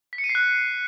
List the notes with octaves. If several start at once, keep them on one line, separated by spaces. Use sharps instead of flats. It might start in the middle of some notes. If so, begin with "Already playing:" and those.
B6
C#7
D#7
C7
F#6